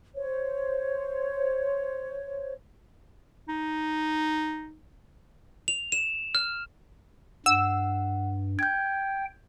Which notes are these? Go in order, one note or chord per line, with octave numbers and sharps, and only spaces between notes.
C5 C#5
D#4
F7
E7
F6
G2 F#5 E6
G5 G6 G#6